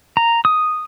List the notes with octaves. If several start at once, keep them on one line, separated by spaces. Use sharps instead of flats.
A#5
D#6